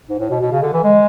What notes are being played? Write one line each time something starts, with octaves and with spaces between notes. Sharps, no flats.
G#2
A2
B2
B2
C#3
D3
E3
G#3